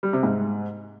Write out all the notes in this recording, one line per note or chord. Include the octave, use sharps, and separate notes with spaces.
G3
C3
G#2